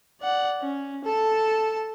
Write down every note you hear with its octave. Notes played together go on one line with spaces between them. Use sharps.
D5 F#5
C#4
A4 A5